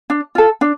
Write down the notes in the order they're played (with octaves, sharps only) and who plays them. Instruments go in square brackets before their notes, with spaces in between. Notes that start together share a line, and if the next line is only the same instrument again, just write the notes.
[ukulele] D4
F4 A4
D4